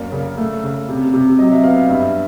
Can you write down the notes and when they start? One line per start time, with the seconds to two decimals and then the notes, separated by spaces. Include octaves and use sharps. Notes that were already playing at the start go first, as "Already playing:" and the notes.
Already playing: F#2 A#3 D5
0.12 C#3
0.38 A3
0.63 C#3
0.89 C3
1.14 C3
1.39 F#3 D#5
1.52 E5
1.63 B3 F5
1.76 F5
1.89 G2 E5